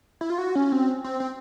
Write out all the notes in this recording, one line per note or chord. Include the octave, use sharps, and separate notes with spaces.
E4
F4
F#4
C#4
C4
C4
C4